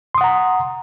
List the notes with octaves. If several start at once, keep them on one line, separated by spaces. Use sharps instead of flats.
F#5 A#5 C6 D#6